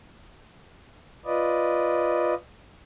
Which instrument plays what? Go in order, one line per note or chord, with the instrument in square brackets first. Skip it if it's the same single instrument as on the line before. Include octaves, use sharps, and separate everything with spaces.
[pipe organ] F4 B4 D5 D#5